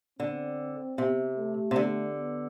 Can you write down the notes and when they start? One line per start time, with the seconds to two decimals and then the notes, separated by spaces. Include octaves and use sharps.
0.19 D3 C4
0.98 C3
1.37 A3
1.71 C3
1.76 D3
2.16 B3